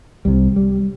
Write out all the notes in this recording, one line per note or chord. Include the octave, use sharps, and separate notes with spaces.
C2 C3 G3
G3